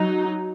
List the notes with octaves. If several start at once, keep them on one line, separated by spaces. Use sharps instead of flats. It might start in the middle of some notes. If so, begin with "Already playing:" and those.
Already playing: F#3 D#4